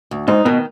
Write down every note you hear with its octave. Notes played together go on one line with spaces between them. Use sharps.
D2
G#2 D#4
B2 D#3